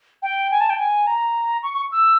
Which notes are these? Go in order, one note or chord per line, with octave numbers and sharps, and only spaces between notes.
G5
G#5
A5
G5
G#5
A#5
C#6
C#6
E6